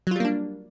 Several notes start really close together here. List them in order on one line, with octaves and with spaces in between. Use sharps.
F#3 F4 G3 A#3 D4